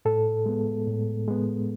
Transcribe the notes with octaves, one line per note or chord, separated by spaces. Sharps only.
A2 A4
G#3 B3
A2
G#3 B3